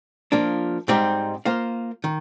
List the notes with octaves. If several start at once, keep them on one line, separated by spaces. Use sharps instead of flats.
F3 A#3 D4
G#2 G3 C4 D#4 G4
A#3 F4 C5 F5
D#3